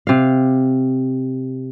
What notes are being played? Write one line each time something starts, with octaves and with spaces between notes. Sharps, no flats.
C3 F5